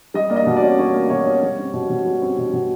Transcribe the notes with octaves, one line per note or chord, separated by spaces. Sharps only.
G3 D#5
A#3 D5
D#5
B2
D5
C#4
G3 C#5
A#3
B2 C#5
C#4
G3
C4
B2
B2
G3
C4
B2
B2